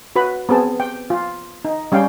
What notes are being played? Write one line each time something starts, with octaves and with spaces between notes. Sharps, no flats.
F#4 B4 B5
B3 C4 G#4 A5
G5
F4
D#4
G3 C#4 F5 G5